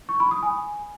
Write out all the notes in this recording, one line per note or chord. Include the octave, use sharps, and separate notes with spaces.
C#6
B5
D#6
G#5